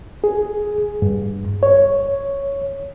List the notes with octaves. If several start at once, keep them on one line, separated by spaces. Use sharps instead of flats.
G#4
G2
C#5